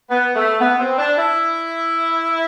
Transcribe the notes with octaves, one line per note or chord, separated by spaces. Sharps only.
B3
A3
B3
C4
D4
E4